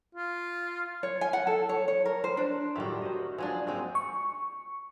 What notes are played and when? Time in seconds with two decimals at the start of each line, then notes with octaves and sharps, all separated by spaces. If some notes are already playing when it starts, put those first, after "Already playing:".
0.15 F4
1.03 C#5
1.21 G#5
1.33 F#5
1.47 A4
1.69 C#5
1.88 C#5
2.06 A#4
2.24 C5
2.37 D4
2.76 A2 D#3 F#3 G3 A3 F4 F#4 E5
3.02 F#4 C5 D#5
3.38 F3 F#3 G#3 D4 G#5
3.67 F#3 G#3 A#3 C4 D#4
3.95 C#6